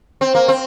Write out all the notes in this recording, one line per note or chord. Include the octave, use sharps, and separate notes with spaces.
C4
A#3
C4